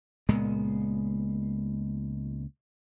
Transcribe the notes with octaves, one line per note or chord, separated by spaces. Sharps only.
C#2 A#2 G#3 B3